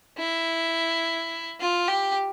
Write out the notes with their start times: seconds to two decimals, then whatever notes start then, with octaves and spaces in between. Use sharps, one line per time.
0.18 E4
1.60 F4
1.88 G4